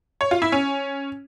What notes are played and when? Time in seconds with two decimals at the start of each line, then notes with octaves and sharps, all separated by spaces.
0.21 C#5
0.31 F4
0.42 E4
0.52 C#4